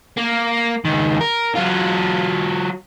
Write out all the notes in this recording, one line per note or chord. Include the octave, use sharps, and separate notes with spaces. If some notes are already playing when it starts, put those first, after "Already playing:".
A#3
C#2 D#3
A#4
F#3 F4